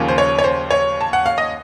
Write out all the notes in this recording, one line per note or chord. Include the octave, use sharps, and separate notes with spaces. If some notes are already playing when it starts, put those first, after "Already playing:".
Already playing: D#2 C#3 F3 A#3 C#4
C5
C#5
C#5
C5
C#5
A5
F#5
F5
D#5